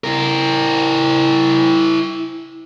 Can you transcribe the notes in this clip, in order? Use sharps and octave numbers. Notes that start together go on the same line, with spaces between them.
E4 A#4